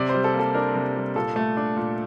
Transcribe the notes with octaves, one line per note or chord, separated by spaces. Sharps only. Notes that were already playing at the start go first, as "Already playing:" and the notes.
Already playing: C3 D5
G3 C5
A4
A#3
A4
D4 A#4
C3
G3
A#2 A4
A3
D4
A#2